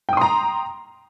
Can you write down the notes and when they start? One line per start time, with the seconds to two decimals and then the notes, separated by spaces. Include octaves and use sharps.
0.09 G5
0.13 D#6
0.17 C6
0.21 A#5